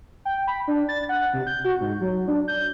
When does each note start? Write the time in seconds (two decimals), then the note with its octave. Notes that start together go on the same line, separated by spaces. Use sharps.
0.25 G5
0.48 B5
0.68 D4
0.89 A6
1.09 F#5
1.33 C3
1.47 G6
1.64 F#4
1.81 G#2
2.01 F#3
2.28 D4
2.48 G6